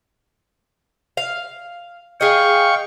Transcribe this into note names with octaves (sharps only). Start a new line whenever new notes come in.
F5
G#4 D#5 F5 G5 C#6